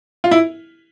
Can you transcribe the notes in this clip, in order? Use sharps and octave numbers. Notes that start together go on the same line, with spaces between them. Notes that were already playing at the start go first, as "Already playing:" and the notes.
F4
E4